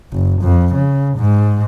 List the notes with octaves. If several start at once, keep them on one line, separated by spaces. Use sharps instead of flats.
F#1
F2
C#3
G#2